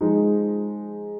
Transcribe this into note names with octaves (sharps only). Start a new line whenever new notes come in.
F3 G#3 D#4